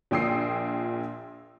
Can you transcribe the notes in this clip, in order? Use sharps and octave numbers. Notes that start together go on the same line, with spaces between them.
A#1 A#2 G5 D#6 E6 C7